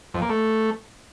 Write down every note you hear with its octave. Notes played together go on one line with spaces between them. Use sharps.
F2
A#3
A3